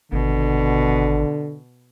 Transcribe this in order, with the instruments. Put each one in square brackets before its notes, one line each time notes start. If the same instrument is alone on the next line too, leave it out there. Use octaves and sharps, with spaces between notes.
[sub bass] G#1 [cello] B2 [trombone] D3